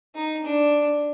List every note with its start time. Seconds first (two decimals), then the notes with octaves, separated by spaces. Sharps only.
0.15 D#4
0.44 D4